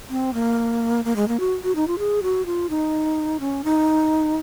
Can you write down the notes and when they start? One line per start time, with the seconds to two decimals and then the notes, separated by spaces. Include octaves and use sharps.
0.10 C4
0.34 A#3
1.05 A#3
1.16 G#3
1.28 A#3
1.40 F#4
1.64 F#4
1.75 D#4
1.88 F4
1.99 G#4
2.23 F#4
2.46 F4
2.70 D#4
3.40 C#4
3.64 D#4